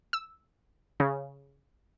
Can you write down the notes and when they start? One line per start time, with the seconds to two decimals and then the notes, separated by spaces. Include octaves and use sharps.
0.13 E6
1.00 C#3